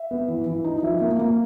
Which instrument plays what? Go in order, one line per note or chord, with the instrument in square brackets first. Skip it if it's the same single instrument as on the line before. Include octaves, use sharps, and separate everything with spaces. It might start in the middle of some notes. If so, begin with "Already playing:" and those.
Already playing: [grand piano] E5
[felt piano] B3
E3
E3
D#4
[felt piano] F3 [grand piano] E5
[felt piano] A#3
A#3